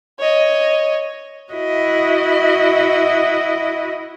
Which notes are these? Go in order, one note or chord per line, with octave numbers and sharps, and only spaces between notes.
C#5 D#5
E4 F#4 D#5 E5